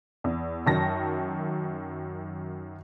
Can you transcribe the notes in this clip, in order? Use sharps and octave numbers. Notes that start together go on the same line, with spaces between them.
E2
F#2 D#3 A5 A#6